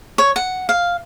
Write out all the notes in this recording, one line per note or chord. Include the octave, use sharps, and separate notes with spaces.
C#5
F#5
F5